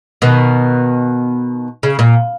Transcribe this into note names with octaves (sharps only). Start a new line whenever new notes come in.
B2 D#3
C#3
A#2